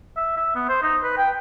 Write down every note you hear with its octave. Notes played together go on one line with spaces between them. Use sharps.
E5
E5
B3
C5
D#4
B4
G5